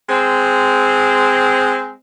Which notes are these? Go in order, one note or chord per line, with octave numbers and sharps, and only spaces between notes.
G#3 C4